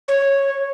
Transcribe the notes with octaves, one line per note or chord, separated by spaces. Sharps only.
C#5